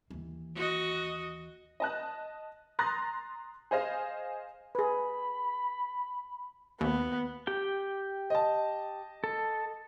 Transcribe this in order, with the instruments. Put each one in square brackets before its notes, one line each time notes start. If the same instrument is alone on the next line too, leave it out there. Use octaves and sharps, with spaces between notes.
[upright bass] D#2 E3
[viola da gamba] F#4 D#5
[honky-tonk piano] D#5 A5 F#6
A#5 C6 D#6 F#6 A6 A#6
G#4 C5 D#5 F5
[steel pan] G#4 B4 [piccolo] B5
[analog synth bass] D#2 [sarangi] B3
[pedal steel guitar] G4 G5
[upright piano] D#5 A5
[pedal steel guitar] A4